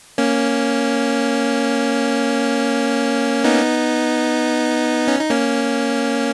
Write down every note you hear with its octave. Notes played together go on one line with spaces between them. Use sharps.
A#3 C#4
B3 D#4
C#4
D#4
A#3 C#4